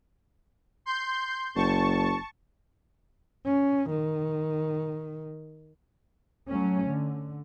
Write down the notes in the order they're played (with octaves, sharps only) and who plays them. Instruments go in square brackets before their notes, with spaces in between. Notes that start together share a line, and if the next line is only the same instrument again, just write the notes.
[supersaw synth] C6 G6
[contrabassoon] F#1 [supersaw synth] A5 C#6
[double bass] C#4
D#3
[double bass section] F#3 A3 C#4
D3